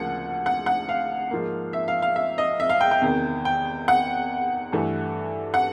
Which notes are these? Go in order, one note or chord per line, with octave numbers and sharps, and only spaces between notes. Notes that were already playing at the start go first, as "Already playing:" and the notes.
Already playing: D2 C#3 F3 A#3 F#5
F#5
F#5
F5
G#2 F3 A#3
E5
F5
F5
E5
D#5
E5
F5
G5
G5
E2 C3 D#3
G5
F#5
G2 E3 A3
F#5